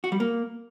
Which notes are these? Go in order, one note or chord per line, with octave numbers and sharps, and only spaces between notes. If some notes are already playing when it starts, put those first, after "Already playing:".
F#4
G3
A#3